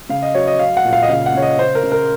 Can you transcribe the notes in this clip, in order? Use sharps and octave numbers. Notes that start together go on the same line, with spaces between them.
C#3 F5
D#5
F#3 C#5
D#5
F#3 F5
F#5
A#2
F5
D#5
C#3 F5
F#5
C#3 C#5
D#5
C#3 C5
A#4
C#3
A#4